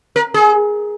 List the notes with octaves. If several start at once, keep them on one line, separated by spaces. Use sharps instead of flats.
A#4
G#4